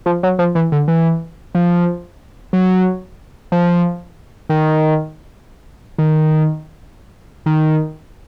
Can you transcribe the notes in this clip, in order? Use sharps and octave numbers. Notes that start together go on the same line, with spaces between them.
F3
F#3
F3
E3
D3
E3
F3
F#3
F3
D#3
D#3
D#3